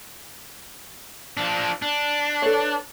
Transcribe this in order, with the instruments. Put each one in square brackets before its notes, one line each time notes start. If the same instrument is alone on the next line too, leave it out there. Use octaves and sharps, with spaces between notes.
[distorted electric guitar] F3 D4
D4
[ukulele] A4 B4 C#5